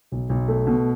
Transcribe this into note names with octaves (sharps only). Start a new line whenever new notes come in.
B1
B1
A3
B2